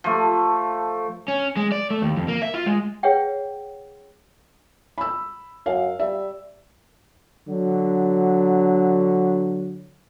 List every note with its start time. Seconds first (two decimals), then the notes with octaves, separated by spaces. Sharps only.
0.04 F3 A3
1.28 C#4
1.57 G#3
1.72 D5
1.91 A3
2.02 D#2
2.16 F2
2.28 A#3
2.42 E5
2.54 F4
2.66 G#3
3.03 G#4 B4 C#5 E5 F#5 G5
4.98 B5 E6
5.66 F#2 F5
5.99 G3 E5
7.47 D3 F#3